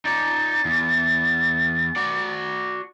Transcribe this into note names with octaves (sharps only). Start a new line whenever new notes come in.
D#4 D5 A6
E2
F#4 D5